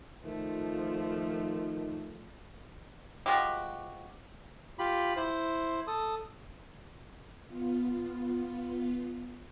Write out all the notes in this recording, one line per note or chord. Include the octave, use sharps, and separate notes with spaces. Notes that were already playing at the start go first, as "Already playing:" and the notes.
D#3 F3 A3
F3 G#3 F#4 G4
F4 G4 B5
E4 C5
A4 D#6
B3 F4